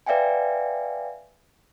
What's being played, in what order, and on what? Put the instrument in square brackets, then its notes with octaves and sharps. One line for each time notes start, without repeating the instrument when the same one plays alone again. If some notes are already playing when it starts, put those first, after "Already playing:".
[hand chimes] B4 D5 E5 F5 G5 G#5